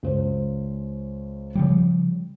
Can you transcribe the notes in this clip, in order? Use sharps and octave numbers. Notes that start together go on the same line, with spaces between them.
C#2 C5
C#3 F3 G3